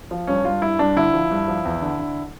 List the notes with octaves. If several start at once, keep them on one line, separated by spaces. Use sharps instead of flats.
F3
G2 C#4
G2 F4
G2 E4
G2 D4
D3 E4
F3
G2
F3
E2
D3
D3